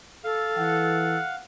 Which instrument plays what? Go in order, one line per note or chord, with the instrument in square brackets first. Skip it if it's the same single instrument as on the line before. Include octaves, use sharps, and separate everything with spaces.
[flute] A4 [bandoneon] F5
[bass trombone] E3 [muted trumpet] F#5